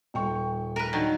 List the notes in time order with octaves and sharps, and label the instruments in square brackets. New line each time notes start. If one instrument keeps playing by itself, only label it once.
[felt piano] D#1 G5 C#6
[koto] A#4 B4
D3 D#3 F#3